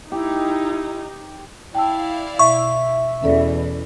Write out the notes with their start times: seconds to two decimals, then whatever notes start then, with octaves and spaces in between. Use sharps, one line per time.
0.12 D#4 E4 G4
1.75 E4 D5 F5 G5 A5 E6
2.39 B2 E5 C#6
3.23 E2 B2 E3 C#4 A4 D5